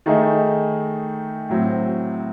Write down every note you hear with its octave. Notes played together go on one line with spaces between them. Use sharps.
D#3 A3 D#4 G#4
A2 F#3 C4